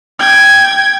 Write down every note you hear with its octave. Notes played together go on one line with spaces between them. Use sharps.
G5 G#6